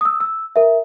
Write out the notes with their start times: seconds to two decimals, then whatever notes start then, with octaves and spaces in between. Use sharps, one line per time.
0.01 D#6 E6
0.20 E6
0.56 A#4 E5